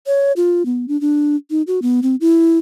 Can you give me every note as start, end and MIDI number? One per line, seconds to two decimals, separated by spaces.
0.07 0.32 73
0.36 0.65 65
0.66 0.86 59
0.88 0.99 62
1.01 1.36 62
1.51 1.62 63
1.67 1.80 66
1.82 2.00 59
2.03 2.16 60
2.21 2.58 64